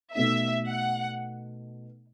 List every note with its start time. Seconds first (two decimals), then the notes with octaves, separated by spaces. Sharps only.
0.14 B2 A3 D#4 E5
0.68 F#5